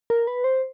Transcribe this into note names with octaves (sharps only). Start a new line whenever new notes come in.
A#4
B4
C5